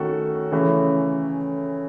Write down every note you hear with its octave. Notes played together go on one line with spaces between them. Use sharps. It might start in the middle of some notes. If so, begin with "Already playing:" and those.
Already playing: D#3 A3 C#4 F#4 A4
C#3 E3 A3 C#4